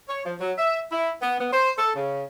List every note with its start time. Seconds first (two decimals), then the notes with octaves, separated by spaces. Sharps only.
0.09 C#5
0.26 F3
0.40 F#3
0.58 E5
0.92 E4
1.22 B3
1.40 B3
1.53 C5
1.78 A4
1.95 C#3